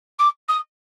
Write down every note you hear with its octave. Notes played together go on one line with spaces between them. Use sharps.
D6
D#6